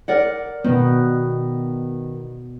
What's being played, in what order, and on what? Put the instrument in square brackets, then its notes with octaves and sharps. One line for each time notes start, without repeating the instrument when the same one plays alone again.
[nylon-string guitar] A#4 D5 F#5
[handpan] B2 B3 [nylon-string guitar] D#3